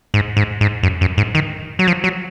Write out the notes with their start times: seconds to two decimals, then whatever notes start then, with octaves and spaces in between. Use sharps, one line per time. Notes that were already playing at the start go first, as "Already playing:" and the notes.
0.14 G#2
0.37 G#2
0.61 G#2
0.83 F#2
1.01 F#2
1.17 G#2
1.35 D#3
1.79 F#3
1.88 F3
2.04 F#3